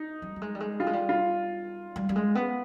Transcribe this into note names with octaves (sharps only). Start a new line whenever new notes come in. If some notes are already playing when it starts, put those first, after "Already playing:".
Already playing: D#4
G3
G3
G#3
G3
G#3
G3 F4
G#3
G3
F4
G3
G3
G#3
B3